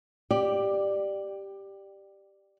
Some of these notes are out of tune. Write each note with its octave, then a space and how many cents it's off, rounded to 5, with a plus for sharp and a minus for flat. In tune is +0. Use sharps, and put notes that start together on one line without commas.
G4 +0 D5 +15